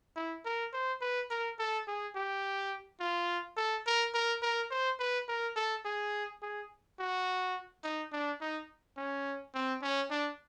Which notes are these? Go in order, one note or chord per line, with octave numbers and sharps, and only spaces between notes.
E4
A#4
C5
B4
A#4
A4
G#4
G4
F4
A4
A#4
A#4
A#4
C5
B4
A#4
A4
G#4
G#4
F#4
D#4
D4
D#4
C#4
C4
C#4
D4